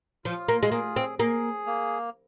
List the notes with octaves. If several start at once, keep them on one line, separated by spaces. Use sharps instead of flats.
F3 F4
A#3
G#3
A#3 G#4
C4
A#3 G#4
A#3